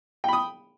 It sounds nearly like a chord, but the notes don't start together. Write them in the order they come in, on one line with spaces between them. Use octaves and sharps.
G5 B5 D#6